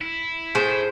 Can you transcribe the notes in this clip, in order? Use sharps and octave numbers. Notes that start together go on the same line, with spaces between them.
E4
A2 G#4 C5